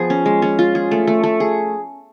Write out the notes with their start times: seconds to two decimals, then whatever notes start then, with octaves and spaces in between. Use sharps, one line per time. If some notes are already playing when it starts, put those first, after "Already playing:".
Already playing: F3 B3 G#4
0.10 C#4
0.26 G#3
0.42 C#4
0.59 F4
0.75 G#4
0.91 A3
1.07 A3
1.24 A3
1.40 G#4